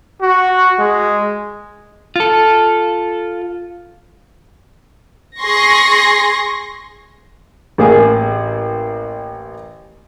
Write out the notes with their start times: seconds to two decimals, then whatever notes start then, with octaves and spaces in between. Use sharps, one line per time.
0.21 F#4
0.79 G#3
2.16 F4 A4
5.41 G#4 C6 C#6 A#6
7.78 A1 A#3 G#4